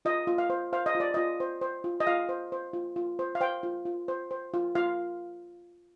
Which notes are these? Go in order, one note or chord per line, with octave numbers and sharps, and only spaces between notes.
F4 D#5
F4
F5
C5
C5 F5
D#5
F4
D5
F4 D#5
C5
C5
F4
D#5
F4 F5
C5
C5
F4
F4
C5
F5
C5 G5
F4
F4
C5
C5
F4
F4 F5